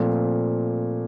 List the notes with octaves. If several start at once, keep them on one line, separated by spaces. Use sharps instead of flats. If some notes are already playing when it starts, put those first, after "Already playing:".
Already playing: A#2 F3 A3 C4